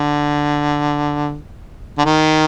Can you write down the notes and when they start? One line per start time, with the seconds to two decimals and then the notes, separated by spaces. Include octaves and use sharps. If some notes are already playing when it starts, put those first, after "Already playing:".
Already playing: D3
1.98 D3
2.05 D#3